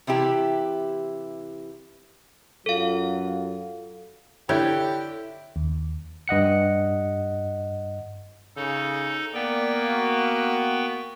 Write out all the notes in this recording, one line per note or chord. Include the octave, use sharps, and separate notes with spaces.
C3 E3 E4 G4
F#2 F#3 F4 A4 F5
D3 E4 G4 C#5 G6
D#2
G2 D#5 F#5 C#7
C#3 D#4 A4
A#3 B3 D5 G5
F#4